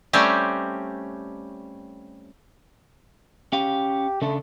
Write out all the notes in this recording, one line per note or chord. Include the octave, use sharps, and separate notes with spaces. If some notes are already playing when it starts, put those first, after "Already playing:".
G3 A3 C4 C#4 G4
C#4 G4 F5
C#3 A3 D4 A4